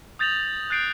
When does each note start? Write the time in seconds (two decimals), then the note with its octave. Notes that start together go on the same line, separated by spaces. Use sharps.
0.19 D#6 G6 A6 A#6 F7 F#7
0.70 F#6 G6 A6 C7 D7